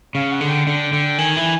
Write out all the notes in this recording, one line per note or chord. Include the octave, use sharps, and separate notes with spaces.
C#3 F5
F#5
D3
G5
D3
D3
D#3 G#5
E3 G#5